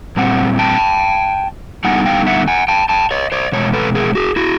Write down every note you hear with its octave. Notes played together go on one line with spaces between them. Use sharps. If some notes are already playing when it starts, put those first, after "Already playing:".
A#2 G3 C4 F#5
G5 A5
D3 G3 B3 D#4 F#5 G#5
F5 G5
E5 F#5
F#5 G#5
G5 A5
G5 A5
C#5 D#5
C5 D5
E2 B2 G#3 C#5
A4 B4
G#4 A#4
F#4 G#4
E4 F#4